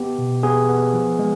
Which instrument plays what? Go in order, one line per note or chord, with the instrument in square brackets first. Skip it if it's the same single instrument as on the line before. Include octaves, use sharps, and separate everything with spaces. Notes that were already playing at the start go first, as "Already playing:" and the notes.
Already playing: [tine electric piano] B3 G4
B2
B3 G#4
B3
F3
G#3